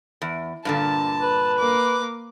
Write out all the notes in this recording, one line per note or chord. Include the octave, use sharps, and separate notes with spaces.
E2
G2 A#2 D3 A5
B4
A#3 D6